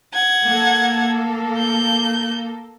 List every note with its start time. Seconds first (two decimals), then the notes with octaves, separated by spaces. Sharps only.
0.14 F#5 G#6
0.46 A#3 A4
1.58 G6